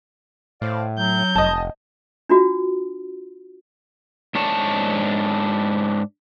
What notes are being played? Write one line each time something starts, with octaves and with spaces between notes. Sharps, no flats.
A2 C5 D5 F5
F#3 G6
F1 D#5 A5
D4 F4 F#4
G#2 D4 C#5 A5